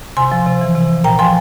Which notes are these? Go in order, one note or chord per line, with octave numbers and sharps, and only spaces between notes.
C3 G#5 C6
F3
C3
E3
C3
F3
A#2 G5 A#5
F3 G#5 C6